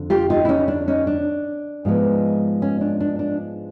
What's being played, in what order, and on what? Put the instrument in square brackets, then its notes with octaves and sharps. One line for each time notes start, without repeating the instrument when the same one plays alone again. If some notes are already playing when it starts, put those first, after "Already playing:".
Already playing: [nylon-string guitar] F2 D3
F4 G4
D#4 F4
E4
C#4 D#4
D4
C#4 D#4
D4
G#2 F3 G#3 B3
C#4
D4
D4
D4